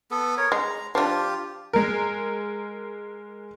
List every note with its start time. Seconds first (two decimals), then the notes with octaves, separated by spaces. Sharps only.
0.11 B3 A4
0.37 A#4 C#5
0.52 G#3 A#5
0.95 F3 D4 F4 G4
1.73 G#3 A#4